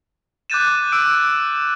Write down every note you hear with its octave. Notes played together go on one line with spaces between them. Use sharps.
D6 F#6 G6 A6 D#7 E7
D6 E6 D7